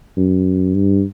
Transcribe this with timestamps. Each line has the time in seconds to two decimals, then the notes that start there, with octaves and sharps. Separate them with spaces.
0.17 F#2
0.74 G2